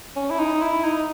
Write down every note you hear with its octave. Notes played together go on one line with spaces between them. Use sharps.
C#4
E4
D#4
E4
D#4